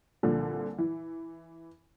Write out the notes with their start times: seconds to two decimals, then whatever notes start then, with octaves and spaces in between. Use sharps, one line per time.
0.23 C2 A#2 D3 F3
0.78 E3